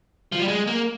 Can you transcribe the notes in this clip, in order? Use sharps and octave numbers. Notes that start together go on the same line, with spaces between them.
F3
G3
G#3
A#3